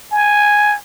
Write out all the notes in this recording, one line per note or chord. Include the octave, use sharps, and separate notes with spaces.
G#5